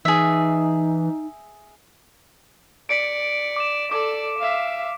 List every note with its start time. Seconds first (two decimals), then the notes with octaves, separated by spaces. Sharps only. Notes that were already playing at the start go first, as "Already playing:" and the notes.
0.05 E3 D#4 G#4 E5
2.89 D5 B6 C#7 D7
3.56 D6 C#7 E7
3.92 A4 D5 D6
4.39 E5 F5